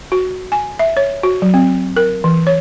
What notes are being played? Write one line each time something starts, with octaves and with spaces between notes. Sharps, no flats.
F#4
G#5
E5
C#5
F#4
F#3
C4
A#4
E3
C#5